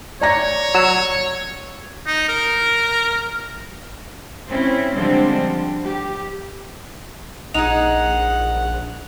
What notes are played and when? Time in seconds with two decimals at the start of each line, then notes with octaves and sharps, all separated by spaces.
0.21 C#5 D5 A#5 A#6
0.74 F#3 E6
2.07 D#4
2.29 A#4
4.48 C4 C#4 E4
4.93 D3 F3 G3 G#3 C4
5.85 G4
7.54 A#1 G#3 D#4 F#5 F7